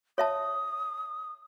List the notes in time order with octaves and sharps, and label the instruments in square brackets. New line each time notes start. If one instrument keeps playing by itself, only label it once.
[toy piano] C#5 E5 A5 [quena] D#6